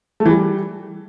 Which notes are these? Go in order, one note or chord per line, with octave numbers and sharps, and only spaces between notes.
A3
E3
G3